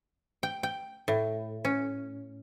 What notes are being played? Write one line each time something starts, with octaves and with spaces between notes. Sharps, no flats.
G5
G5
A2
C#4